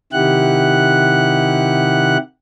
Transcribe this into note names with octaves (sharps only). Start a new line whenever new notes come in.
C3 D#3 E4 G4 F#5 F#6